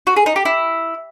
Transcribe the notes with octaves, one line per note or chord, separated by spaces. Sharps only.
F#4
G#4
D#4
G4
E4